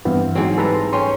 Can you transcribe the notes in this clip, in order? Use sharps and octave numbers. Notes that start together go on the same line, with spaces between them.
G2 E3 B3 C4 F5
G#2 F#3 C4
E3 G3 E4 A4 B4 A#5
C6
C#4 C#5 G5 C6